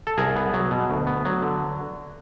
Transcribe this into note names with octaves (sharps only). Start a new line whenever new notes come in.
A4
C2 G#4 A#4
B3
F#3
B2
D2
B3
F#3
D3